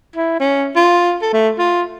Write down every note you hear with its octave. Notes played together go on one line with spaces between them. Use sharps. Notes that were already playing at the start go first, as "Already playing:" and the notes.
E4
C#4
F4
A4
A3
F4